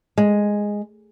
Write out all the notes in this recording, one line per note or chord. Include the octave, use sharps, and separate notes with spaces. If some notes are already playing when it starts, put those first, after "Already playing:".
G#3